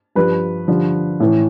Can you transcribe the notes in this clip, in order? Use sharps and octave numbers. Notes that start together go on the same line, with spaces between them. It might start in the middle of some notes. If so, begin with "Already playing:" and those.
G2 F3 B4
G2 D3 F3
A2 E3